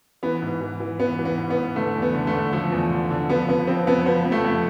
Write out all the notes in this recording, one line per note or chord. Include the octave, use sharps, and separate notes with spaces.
E3 B3
G#2
E3
E3
E3 B3
E3
B3
G#2
B3
G#2
D3 A3
E2
B3
D3
A3
D3
F3 A3
E2
D3
D3
F3 B3
F2 B3
F3 C4
F2 B3
F3 B3
F2
A3
F2